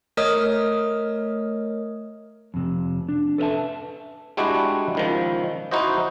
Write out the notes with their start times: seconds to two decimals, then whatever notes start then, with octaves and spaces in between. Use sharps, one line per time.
0.17 A3 A#4 C#5 D#5 D#6 F6
2.54 F2 C3
3.09 D4
3.38 A4 B4 C5 E5 A5
4.37 G3 G#3 D4 E4 F#4 G4
4.95 C#2 D#3 F3
5.71 D#4 E4 F#4 C5 D#5